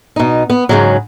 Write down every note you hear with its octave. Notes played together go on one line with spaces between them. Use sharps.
B2 D#4
B3
G#2 C#3 F#3